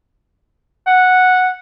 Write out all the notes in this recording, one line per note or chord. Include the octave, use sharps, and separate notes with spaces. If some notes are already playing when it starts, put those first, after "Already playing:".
F#5